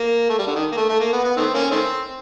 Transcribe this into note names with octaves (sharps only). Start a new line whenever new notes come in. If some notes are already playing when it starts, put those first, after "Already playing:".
Already playing: A#3
A3
G3
D3
D#3
A#3
A3
A3
A#3
B3
B3
D#3 A3 C4
A#3 C#4
D#3 A3 C4